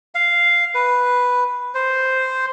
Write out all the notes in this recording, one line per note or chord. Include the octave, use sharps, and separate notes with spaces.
F5
B4
C5